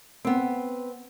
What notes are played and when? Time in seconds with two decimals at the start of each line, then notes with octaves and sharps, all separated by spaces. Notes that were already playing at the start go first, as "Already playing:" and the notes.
0.25 B3 C4